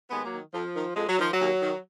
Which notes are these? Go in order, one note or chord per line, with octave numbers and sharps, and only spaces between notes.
D#2 G#3 B3
F#3 A#3
D#3
F2 F3
D#3
F2 G#3
F#3
D#3 F3
F#3
D#2
D#3